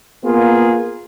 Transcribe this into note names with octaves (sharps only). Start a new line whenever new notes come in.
A#3 B3 F4 G#4